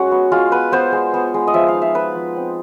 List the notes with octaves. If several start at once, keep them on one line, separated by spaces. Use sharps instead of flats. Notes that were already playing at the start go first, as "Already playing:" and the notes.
Already playing: G#3 C#4 F#4
B3
G#3 F4
B3 B4
B3 C5
G#3
B3
G#3
D#5
F3 E5
F5
D#4
E5
F3 B4
F3
C4